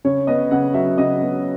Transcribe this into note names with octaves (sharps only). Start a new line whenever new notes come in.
C#3 C#5
B3 D#5
C#3 F#5
F#3 E5
C#3 D#5
B3